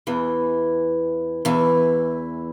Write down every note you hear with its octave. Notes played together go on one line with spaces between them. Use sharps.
E2 E3
E2 E3